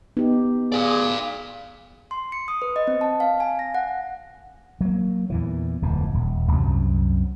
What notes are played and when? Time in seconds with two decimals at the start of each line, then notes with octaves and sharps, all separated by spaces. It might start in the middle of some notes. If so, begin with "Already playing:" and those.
0.17 B3 D#4 G4
0.72 G#4 D5 F5
2.11 C6
2.32 C#7
2.48 D#6
2.62 B4
2.76 D#5
2.87 C4
3.01 A5
3.20 F5
3.40 G#5
3.59 A#6
3.75 F#5
4.81 F#3 A#3
5.30 E2 A#2 E3
5.82 D1 F2 B2
6.14 D#1
6.51 C2 F#2 C3 F#3